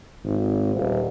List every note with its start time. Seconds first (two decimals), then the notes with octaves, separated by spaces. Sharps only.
0.24 G#1
0.76 D#1